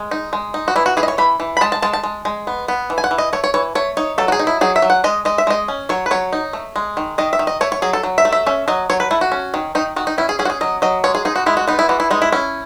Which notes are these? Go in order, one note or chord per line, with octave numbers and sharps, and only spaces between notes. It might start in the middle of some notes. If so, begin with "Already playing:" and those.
Already playing: G#3
D#4
G#3
D#4
F#4
E3 E4
F#4
E3 G#4
D#5
C#5
E3 B5
E3
B5
G#3 A5
A5
G#3 A5
A5
G#3
G#3
B3
B3
E3
G#5
F#5
E3
D#5
A3 C#5
C#5
E3 C#5
A3 C#5
D#4 C#5
F#3 A4
F#4
G#4
D#4
E4
F#3 G#4
E5
F#3
F#5
G#3 D#5
G#3 D#5
E5
G#3 D#5
C#4
F#3 C#5
B4
F#3 C#5
D#4
A3
G#3
D#3
D#3 D#5
E5
D#3
D#5
A3 C#5
C#5
F#3 G#4
A4
F#3
E5
A3
E5
C#4 E5
F#3 D#5
F#3 C#5
B4
A3 E4
F#4
C#4
D#3
D#3 D#4
D#3 F#4
D#4
C#4 E4
G#4
C#4 G#4
F#4
G#4
F#3 D#5
F#3 D#5
G#3 C#5
G#4
D#4 G#4
F#4
G#3 E4
F#4
B3 D#4
E4
E3 F#4
E4
G#3 D#4
E4
C#4 E4